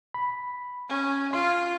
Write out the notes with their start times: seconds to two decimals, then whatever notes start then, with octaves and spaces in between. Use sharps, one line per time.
0.14 B5
0.89 C#4
1.33 F4 C6